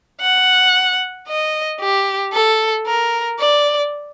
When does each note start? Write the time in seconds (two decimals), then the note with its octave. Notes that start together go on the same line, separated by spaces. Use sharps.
0.21 F#5
1.27 D#5
1.80 G4
2.33 A4
2.87 A#4
3.39 D5